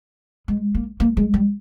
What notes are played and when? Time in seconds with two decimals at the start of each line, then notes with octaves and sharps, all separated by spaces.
0.48 G#3
0.75 A#3
1.00 A#3
1.17 G#3
1.34 G3